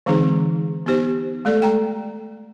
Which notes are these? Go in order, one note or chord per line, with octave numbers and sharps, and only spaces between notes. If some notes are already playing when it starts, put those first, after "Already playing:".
D3 E3 G#3 C4 D#4 G#4
B3 D#4 G4 C5
G#3 A3 A4 D5
G5 A#5